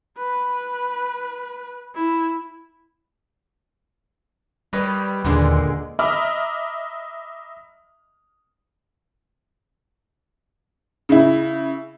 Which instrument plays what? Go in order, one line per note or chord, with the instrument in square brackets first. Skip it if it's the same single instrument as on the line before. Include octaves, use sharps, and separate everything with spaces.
[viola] B4
E4
[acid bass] G3 [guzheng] B4 C#5 D#5
[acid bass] D#2 [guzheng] A#2 D3 G#3
[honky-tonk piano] D#5 E5 A#5 B5 D6 F6
C#3 E4